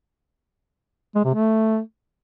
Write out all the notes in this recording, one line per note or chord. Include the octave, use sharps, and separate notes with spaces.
G#3
C3
A3